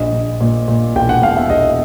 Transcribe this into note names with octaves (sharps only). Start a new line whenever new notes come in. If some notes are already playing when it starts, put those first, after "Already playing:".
Already playing: A#1 D#5
A#1
A#2
A#2
E1 G5
F#5
B2 F5
E5
E1 D#5